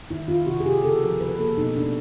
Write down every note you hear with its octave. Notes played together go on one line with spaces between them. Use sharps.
D#3 E4
D#3 F4
C3 F#4
G#4
C3 G4
C#3 A4
F3 A#4
C#3 B4
A#3 A4
B2 D#4
A3 D4